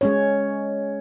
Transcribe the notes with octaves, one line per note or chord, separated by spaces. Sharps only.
G#3 C#4 C#5